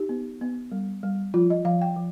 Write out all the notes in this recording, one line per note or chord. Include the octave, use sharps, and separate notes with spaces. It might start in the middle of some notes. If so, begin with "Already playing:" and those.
Already playing: D#4 G4
B3
B3
G3
G3
F3 F4
D#5
F3 F5
G5
F3